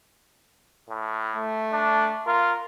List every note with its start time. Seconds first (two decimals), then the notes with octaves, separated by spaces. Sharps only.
0.89 A2
1.35 A3
1.72 D4
2.27 F4 A#4